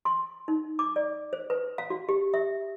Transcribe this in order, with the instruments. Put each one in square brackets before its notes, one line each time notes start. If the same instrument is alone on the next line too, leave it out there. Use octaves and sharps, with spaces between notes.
[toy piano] C6
D#4
D6
D5
C5
B4
F5
F#4
G4
E5